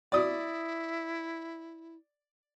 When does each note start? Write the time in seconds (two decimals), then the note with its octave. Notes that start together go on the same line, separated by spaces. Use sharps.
0.12 E4 D5 D#6